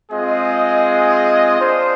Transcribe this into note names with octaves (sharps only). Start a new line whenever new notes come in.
G#3 C4 F4 G#4 D#5
D4 F4 C5